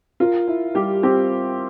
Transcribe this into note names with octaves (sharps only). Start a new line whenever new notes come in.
F4 A#4
E4
G3 G4
C4 G4